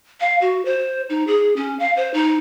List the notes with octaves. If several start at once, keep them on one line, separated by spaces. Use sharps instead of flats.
F5
F#4
C5
D#4
G#4
C#4
F5
C5
D#4